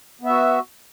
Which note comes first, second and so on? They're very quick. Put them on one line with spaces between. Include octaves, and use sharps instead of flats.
B3 E5 F#4